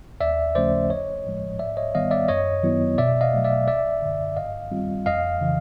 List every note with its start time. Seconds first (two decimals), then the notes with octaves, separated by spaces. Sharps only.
0.20 D#2 D5 E5
0.55 C#3 F3 A3 C#4 C5 D5
0.90 A#1 C#5 D#5
1.25 A2 F3 G#3
1.59 G#2 D5 E5
1.77 C#5 D#5
1.95 D#3 G3 B3 D#5 F5
2.11 D5 E5
2.28 F#2 C#5 D#5
2.63 D#3 F#3 B3 E4
2.98 B2 D5 E5
3.21 D#5 F5
3.33 F#3 A3
3.44 D5 E5
3.68 G1 D5 E5
4.02 F#2 D3
4.37 G2 D#5 F5
4.71 D#3 G3 C4 F4
5.06 F2 D#5 F5
5.41 C#3 E3